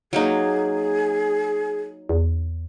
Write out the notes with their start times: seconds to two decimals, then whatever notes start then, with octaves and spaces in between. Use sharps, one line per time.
0.13 F#3 A#3 D#4 G#4
2.09 E2